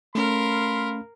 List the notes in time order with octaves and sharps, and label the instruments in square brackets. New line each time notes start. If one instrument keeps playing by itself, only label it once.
[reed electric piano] A3 C#4 [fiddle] A#4 [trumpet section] F5 B5 C6